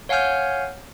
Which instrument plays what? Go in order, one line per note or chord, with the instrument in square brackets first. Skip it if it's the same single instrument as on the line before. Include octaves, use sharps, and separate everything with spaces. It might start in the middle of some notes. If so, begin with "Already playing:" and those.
[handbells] C#5 F5 F#5 G#5 F6 G6